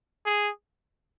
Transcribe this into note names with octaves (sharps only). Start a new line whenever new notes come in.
G#4